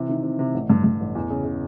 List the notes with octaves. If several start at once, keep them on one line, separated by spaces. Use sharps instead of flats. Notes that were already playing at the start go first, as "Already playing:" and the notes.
Already playing: C3 E3
D#3
C3
C3
A1
G2
G2
A1
E2
C#3
C#3